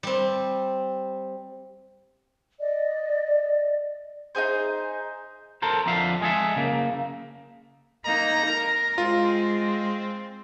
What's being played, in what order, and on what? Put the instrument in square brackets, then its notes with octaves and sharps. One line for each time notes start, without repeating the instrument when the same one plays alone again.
[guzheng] G3 C4
[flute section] D5 D#5
[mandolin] D#4 E4 G#4 C5
[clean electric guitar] A4 A#4 C5
F2 D3 F3 E5 F5
G#3 G#4 A4 E5
C#3 A#3
[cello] A#3 D#4 [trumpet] A#5
[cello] A#4
[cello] G#3 [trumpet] C4 [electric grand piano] F4